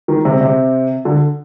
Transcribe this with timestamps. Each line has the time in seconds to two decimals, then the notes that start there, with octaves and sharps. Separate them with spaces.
0.08 D#3
0.25 C3
0.41 C3
1.05 D3